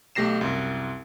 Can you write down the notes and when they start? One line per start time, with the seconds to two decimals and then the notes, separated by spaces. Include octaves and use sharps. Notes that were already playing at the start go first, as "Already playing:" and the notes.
0.15 B1 A3 G4 A#6 C7 E7
0.41 C2 F#2